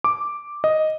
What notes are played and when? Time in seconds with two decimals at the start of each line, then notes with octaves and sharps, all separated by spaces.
0.04 D6
0.64 D#5